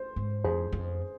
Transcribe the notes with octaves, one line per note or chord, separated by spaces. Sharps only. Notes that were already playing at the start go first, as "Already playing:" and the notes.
Already playing: C5
G#2
F2 G#4 C5
F2